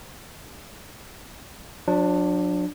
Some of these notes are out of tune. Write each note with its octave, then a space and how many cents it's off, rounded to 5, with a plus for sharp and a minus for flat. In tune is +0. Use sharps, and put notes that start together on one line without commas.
F#3 -40 D4 +10